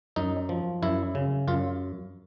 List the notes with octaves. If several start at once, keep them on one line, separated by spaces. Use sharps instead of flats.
F#2 D#4
F3
F#2 E4
C#3
F#2 F4